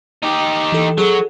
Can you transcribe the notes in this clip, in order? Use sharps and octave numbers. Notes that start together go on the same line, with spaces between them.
D#4 G4
E3 A4
F#3 G#4 A4